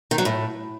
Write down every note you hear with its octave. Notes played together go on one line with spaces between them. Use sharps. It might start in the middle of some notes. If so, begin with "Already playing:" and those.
D#3
F#3
A2